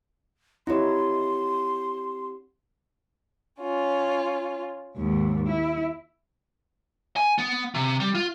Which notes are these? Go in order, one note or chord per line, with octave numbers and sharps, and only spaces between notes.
C4 D#4 E4 G4 C#5 C6
C#4 F4
D#2 G#2
E4
G#5
B3
C3
G3
F4